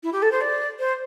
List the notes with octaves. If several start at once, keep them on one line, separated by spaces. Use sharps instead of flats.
E4
G4
A4
C5
D5
C5